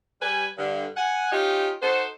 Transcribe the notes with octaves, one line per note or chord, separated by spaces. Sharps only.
G3 B4 G#5
G2 D3
F#5 G#5
C#4 D#4 F4 G4
D#4 F#4 A4 C5